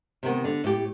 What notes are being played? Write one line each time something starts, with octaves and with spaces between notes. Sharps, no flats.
C3 D#3 B3
D3
A2 G4